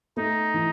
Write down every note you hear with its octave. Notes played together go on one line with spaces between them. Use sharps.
A3 D#4
E3